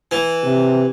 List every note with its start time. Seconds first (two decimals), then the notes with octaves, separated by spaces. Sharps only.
0.11 E3
0.43 C3